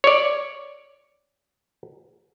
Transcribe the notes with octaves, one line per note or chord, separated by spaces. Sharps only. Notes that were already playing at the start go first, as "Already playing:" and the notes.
C#5 D5